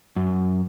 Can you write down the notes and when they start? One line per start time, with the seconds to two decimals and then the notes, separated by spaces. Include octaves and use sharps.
0.16 F#2